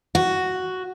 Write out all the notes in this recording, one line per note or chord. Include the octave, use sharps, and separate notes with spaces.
F#4